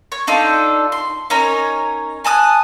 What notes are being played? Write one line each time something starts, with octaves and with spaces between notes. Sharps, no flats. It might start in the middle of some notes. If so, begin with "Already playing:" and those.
C#5
D4 D#4 F4 A4
C6
C#4 D#4 A#4 C#5
G#5 A5 D#6 F#6